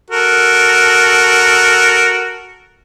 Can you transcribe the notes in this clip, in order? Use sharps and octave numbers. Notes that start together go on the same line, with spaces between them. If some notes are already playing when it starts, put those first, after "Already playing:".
F#4 A4 A#4